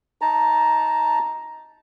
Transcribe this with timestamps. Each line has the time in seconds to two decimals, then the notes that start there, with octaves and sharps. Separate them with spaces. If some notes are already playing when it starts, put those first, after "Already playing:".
0.21 D#4 A5 A#5